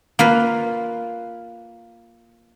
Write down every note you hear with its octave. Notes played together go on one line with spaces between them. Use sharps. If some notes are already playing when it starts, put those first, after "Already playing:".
A#3 F4 B4